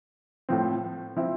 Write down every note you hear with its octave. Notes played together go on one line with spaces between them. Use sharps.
A2 F3 C4
F3 C4 E4